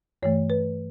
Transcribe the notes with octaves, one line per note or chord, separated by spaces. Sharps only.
G2 E3 A3 C#5
B4